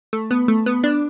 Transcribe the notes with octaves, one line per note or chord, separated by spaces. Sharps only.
A3
B3
A3
B3
D4